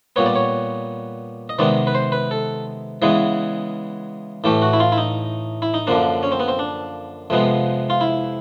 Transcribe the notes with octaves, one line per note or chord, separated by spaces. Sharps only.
A#2 G3 B3 C#5
D5
C#5
D#5
C3 D#3 G#3 B3 D5
B4
C5
B4
A4
C#3 E3 G#3 B3 G#4
A2 E3 A3 G4
F#4
E4
F4
E4
D#4
E4
D#4
F#2 D3 F3 A#3 D4
C#4
C4
B3
C4
D4
F2 C3 F3 G#3 B3
F4
E4